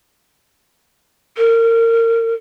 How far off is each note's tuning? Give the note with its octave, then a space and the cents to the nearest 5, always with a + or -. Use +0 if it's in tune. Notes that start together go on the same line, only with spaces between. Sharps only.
A#4 -30